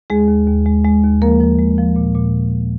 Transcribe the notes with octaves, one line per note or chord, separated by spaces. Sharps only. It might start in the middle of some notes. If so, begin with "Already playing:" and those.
D#2 G#3 G#4
D#2
D#2
G#3
G#3
D#2
F3 A#3 A#4
F3
G#3
F3
A#2
A#2